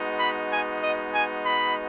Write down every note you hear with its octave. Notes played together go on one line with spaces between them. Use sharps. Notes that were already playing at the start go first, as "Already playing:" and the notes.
Already playing: G#3 B3 D#4 F#4
B5
G#5
D#5
G#5
B5